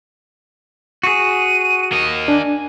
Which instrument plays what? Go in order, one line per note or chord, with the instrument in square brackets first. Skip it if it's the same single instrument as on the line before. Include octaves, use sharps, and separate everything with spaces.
[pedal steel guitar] F#4 G#4 [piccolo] D#7
[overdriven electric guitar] A#3 D#5
[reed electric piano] D4 [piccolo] G#5